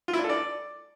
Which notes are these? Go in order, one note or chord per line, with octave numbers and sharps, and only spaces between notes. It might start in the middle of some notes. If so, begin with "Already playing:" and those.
F4
E4
D4
A4
D5